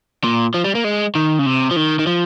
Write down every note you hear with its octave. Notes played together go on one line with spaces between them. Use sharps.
A#2
F3
G3
A#3
G#3
D#3
C#3
C3
F3
D#3
D#3
F3